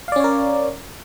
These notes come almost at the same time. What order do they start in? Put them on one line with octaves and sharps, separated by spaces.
F5 D5 C#4 C#5 A#4